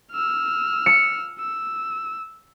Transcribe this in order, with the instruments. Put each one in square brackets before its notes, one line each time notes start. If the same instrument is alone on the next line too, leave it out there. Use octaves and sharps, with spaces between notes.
[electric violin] E6 F6
[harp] C#7
[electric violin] E6